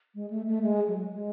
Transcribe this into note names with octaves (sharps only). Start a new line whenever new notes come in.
G#3
A3
A3
G#3
F#3
G#3